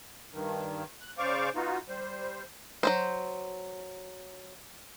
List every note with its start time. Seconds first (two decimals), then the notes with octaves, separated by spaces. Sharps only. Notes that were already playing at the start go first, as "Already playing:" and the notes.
0.33 G2 D#3
1.01 F#6
1.18 C#3 C5 D5 F5 C#6 D6
1.55 B3 D#4 F4 F#4
1.88 G3 C5
2.83 F#3 C4 C5